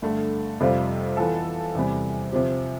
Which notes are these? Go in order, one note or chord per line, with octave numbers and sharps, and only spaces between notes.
G2 D3 A3
F2 C3 G3 C4 F4
E3 B3 F4 A4
E2 C3 G3
C3 F3 C4 G4